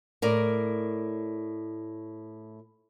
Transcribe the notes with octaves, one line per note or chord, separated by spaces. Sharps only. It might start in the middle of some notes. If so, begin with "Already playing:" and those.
A2 A#4 D5